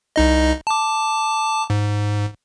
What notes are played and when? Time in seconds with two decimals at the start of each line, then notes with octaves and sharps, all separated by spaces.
0.16 C2 D#4 D#5
0.67 A5 D6
1.70 G#2